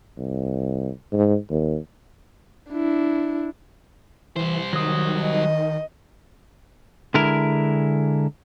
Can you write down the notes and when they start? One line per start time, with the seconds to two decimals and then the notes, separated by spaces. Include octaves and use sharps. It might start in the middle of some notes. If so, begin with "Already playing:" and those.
0.18 C2
1.12 G#2
1.50 D#2
2.71 D4 E4
4.36 E3 G3 C5
4.73 D#3 F#3 D#6
5.22 D#5
7.14 D3 G#3 E4 A#4